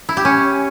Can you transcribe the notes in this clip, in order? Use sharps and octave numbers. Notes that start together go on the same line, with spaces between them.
E4
G4
C#4